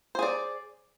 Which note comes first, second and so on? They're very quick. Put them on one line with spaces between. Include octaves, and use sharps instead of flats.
C5 G#4 D5